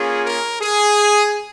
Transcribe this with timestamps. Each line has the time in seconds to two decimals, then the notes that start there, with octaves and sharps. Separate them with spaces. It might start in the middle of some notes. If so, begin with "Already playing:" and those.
Already playing: A#3 C#4 F4 G#4
0.25 A#4
0.62 G#4